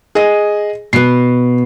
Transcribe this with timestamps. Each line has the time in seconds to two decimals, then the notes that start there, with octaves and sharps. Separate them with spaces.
0.15 G#4 D#5
0.93 B2 B3 C7